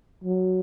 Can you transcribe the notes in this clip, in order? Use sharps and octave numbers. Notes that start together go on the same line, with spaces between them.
F#3